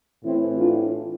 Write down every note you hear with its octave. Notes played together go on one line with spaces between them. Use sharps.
A2 E3 C4 E4
D4 F4